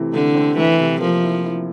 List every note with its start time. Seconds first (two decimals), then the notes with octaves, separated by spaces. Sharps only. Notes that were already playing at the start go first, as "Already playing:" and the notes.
Already playing: C3 E3 A3 C4
0.13 D3 A3
0.35 C4
0.57 E3 A3
0.80 C3
1.01 F3 A#3
1.23 E4
1.44 E4